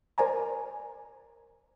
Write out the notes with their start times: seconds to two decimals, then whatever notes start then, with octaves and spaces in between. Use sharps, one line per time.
0.18 A#4 C5 D5 G#5 A#5